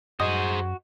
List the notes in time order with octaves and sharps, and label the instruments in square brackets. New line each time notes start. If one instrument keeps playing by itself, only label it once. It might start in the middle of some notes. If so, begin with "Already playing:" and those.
[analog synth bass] F#2 [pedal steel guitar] F#4 [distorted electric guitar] G#4 C5 [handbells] D#5 D#6